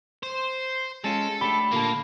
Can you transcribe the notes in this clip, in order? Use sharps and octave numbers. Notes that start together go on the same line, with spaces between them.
C5
G#3 C#4 F4 A4
A3 D4 G4 B5
A#2 D3 A#3 A5